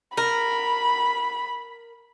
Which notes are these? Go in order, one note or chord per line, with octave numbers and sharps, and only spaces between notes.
A#4 B5